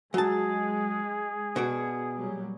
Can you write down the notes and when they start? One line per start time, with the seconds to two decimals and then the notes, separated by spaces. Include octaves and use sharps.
0.14 F#3 G#3 G#4 A5
1.56 B2 F#4 D5
2.15 A#2 F#3 G3